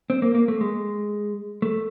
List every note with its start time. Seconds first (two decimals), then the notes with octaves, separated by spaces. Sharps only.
0.10 C4
0.22 A#3
0.35 A#3
0.48 A3
0.61 G#3
1.62 A3